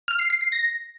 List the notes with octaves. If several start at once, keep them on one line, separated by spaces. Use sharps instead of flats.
F6
C7
C7
C7
A#6